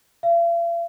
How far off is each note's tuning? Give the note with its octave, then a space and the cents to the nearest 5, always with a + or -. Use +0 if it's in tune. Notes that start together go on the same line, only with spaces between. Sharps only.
F5 -45